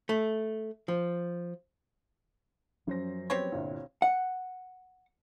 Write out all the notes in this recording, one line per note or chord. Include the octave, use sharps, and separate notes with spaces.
A3
F3
F#2 F3 F#3 C#4 C5 A#6
B3 C4 G4 C#5
G1 C2 A#2
F#5